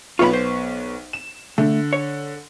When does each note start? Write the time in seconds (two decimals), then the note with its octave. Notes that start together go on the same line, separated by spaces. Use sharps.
0.19 B1 B3 F4 C#5 B5 C#6
0.33 C5
1.13 E7
1.58 D3 A3
1.93 C#5